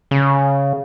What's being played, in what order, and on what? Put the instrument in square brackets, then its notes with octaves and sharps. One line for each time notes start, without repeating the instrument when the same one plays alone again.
[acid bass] C#3